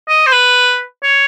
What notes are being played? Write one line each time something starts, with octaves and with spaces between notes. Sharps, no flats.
D#5
C5
B4
C#5